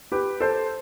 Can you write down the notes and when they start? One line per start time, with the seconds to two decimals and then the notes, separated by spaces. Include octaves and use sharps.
0.12 G4 B4
0.40 A4 C5